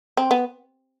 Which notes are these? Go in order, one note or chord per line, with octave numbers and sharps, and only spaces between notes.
C4
B3